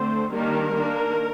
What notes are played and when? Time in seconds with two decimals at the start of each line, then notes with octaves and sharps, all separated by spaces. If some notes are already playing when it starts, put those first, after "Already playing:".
Already playing: D3 A3 C4 C5
0.32 D#3 G3 A#3 D4 A#4
0.74 D#3 A#3 D4